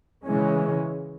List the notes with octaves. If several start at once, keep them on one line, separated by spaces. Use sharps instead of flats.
C#3 E3 G#3 C#4